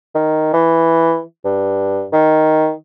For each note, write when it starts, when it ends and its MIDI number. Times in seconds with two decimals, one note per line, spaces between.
0.15 0.53 51
0.53 1.20 52
1.45 2.06 43
2.13 2.72 51